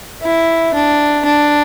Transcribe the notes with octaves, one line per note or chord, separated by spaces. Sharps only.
E4
D4
D4